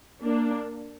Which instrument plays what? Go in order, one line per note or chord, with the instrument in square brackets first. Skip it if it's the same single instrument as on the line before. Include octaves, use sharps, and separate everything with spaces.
[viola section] A#3 D4